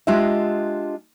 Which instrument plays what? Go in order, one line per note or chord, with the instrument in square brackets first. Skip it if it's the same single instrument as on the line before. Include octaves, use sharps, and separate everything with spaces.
[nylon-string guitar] G#3 D4 F4 G4 D#5 E5